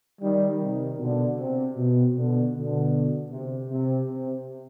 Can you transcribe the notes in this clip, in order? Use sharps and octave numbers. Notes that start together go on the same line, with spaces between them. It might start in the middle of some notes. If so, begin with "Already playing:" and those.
D#3 G3
C3 D#3
B2 D3
C3
B2
B2 D3
B2 D3
C3
C3
C3